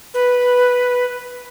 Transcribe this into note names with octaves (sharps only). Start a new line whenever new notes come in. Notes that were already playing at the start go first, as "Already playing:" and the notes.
B4